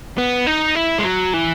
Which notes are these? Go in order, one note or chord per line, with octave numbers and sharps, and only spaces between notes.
B3
D#4
E4
G#3
F#3
E3